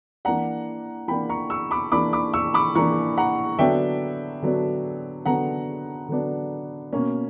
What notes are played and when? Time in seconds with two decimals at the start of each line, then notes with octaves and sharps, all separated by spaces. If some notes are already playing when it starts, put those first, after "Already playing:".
0.25 E3 A#3 D4 F#5 A#5
1.08 E3 A#3 D4 G5 B5
1.29 A#5 C#6
1.50 C#6 E6
1.71 B5 D6
1.92 E3 A#3 D4 B5 D6
2.13 B5 D6
2.34 C#6 E6
2.54 B5 D6
2.75 E3 A#3 D4 A#5 C#6
3.18 F#5 A#5
3.59 D3 F#3 B3 D4 E5 G5
4.42 D3 F#3 B3 D4
5.25 D3 F#3 B3 D4 F#5 A#5
6.08 D3 F#3 B3 D4
6.93 B2 A#3 C#4